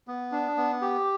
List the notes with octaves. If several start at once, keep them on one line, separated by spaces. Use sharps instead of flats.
B3
D4
B3
G4